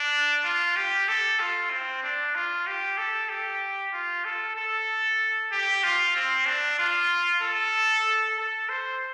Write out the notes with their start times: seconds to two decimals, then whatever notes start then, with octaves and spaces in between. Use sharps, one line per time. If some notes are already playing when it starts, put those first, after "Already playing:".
Already playing: D4
0.45 F4
0.76 G4
1.08 A4
1.40 F4
1.71 C4
2.03 D4
2.35 F4
2.67 G4
2.98 A4
3.29 G4
3.93 F4
4.25 A4
4.56 A4
5.52 G4
5.84 F4
6.16 C4
6.46 D4
6.79 F4
7.42 A4
8.38 A4
8.69 C5